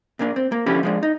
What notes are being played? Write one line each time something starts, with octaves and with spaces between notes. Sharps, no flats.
A#2 A#3 D4
C4
A#3
D3 F3 C#4 E4 G4
F3 G#3 D4
D#4